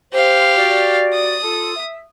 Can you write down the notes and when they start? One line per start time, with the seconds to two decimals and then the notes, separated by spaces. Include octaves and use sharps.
0.13 G4 C5 F5
0.57 F#4 D5
1.13 D#6
1.43 F4 A4
1.76 E5